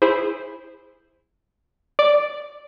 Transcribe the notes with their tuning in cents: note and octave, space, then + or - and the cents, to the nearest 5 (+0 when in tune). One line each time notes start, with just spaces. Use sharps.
E4 +0 G#4 -20 C5 +0
D5 +0 D6 +0